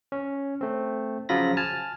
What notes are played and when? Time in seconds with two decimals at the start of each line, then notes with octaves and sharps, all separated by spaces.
0.12 C#4
0.61 A3 C4
1.29 C#3 F3 F#3 F4 B5 A#6
1.57 G#5 A5 F6